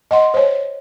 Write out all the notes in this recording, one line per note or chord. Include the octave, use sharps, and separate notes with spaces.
D#5 F#5 C6
C5 C#5